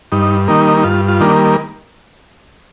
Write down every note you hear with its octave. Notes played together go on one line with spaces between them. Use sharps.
G2 D#4
D#3 G3 A#3 D#4
D#4
G2 F4
F4
D#3 G3 A#3 D4